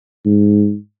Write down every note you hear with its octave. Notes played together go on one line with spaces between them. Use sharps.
G#2